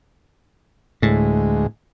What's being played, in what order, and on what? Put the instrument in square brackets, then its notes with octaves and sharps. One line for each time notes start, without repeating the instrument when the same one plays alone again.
[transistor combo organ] D2 G#3 [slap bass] A2